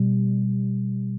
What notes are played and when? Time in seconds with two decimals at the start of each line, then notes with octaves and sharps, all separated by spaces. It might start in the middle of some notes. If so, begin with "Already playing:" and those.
Already playing: B2 G3